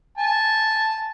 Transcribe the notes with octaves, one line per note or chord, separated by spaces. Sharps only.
G#5 A5